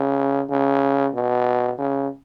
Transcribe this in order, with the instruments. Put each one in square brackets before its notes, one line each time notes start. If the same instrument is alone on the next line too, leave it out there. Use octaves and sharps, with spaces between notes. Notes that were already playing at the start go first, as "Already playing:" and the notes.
Already playing: [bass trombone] C#3
C#3
B2
C#3